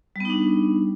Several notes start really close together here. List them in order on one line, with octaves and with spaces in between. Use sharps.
G3 B3 D#4 D4